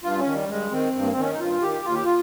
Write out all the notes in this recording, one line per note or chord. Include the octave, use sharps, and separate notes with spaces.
G2 F4
C#4
D#3
G3
G2 G#3
D#3 C4
G2
A#3
C4
D#3 C#4
D#4
G2 F4
D#3 G4
D#2 F4
G4
F4